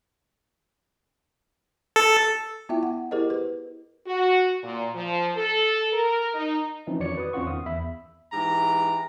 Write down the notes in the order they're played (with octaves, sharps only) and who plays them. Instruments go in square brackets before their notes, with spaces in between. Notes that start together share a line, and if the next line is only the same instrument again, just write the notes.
[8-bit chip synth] A4
[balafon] B3 E4 F4 E5 G5
F#5
E4 G4 G#4 A#4 C5 D#5
B4
[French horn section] F#4
A#2
F3
A4
A#4
D#4
[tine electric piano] E3 F3 C4 C#4 D#4 E4
F2 D#3 F#4 C#5 D5 C#7
B4 D#6
E2 C4 C#4 F4 F#5 C#6
D#3 F5 D#6
E2 E5 B5
[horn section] G#2 E3 G4 A#5